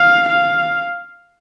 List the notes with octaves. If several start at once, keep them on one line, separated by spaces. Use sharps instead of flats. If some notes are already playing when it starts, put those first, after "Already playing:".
Already playing: F5
F5